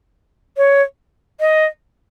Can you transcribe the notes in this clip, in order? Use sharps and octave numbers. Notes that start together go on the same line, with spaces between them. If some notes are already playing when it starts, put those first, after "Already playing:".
C#5
D#5